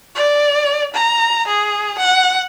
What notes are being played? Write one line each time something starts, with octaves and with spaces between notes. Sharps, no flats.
D5
A#5
G#4
F#5